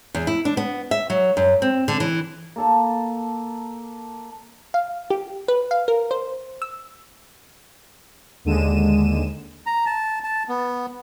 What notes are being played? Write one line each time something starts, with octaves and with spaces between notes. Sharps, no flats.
E2
E4
D4
B3
E5
F#3
F#2
C4
D3
E3
A#3 A4 A5
F5
G4
B4
F5
A#4
C5
E6
D#2 D3 G#3 D#7 E7
A#5
A5
A5
B3